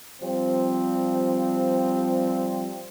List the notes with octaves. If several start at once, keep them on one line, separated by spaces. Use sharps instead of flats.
F3 G3 C4